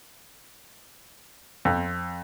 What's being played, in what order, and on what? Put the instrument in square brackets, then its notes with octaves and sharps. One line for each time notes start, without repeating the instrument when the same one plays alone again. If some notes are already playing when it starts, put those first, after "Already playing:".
[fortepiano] F2